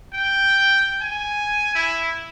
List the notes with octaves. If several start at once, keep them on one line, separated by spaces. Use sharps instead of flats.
G5
G#5
E4